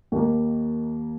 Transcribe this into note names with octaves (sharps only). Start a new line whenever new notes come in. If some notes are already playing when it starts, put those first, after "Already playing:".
D#2 D#3 A#3